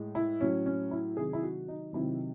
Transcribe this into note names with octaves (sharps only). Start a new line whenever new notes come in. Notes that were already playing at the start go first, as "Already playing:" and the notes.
Already playing: A2 G#3
E4
A2 F#3 C#4
C#4
E4
C3 D#3 F#3 G#4
E4
F#4
D#4
C3 D#3 F#3 E4